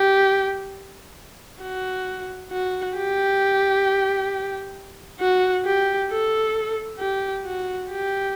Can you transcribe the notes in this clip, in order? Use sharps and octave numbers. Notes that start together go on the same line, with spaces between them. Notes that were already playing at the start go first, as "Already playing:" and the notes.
Already playing: G4
F#4
F#4
G4
F#4
G4
A4
G4
F#4
G4